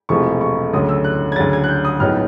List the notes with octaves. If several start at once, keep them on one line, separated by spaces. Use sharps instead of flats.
E1 E2 C3 F3 A3 C#6
C#6
D2 C#3 F#3 A3 D#6
E6
F#6
G#6
D2 C#3 F#3 A6
G#6
F#6
G6
D#6
A#1 A2 F#3 B3 D#4 F6